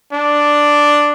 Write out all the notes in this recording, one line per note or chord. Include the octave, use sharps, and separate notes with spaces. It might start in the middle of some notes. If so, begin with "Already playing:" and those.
D4